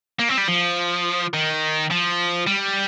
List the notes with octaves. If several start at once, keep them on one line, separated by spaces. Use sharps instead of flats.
A#3
C4
G3
F3
D#3
F3
G3